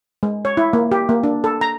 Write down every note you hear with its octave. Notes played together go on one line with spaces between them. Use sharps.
G#3
C#5
E4
A#3
G4
A#3
D4
A4
A#5